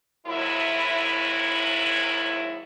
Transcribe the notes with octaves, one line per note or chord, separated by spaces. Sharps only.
D#2 G#2 F#3 E4